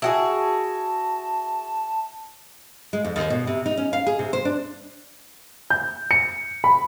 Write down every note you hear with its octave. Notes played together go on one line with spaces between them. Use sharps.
E4 F#4 G#4 A5
G#3
F2
D#2
B2
C3
D#4
C#4
F5
G#4
C3
C5
D4
G6
C#7
B5